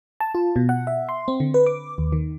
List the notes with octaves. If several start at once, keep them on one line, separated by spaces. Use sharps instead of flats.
A5
F4
B2
F#5
E5
C6
C4
D3
B4
D6
D#2
D#3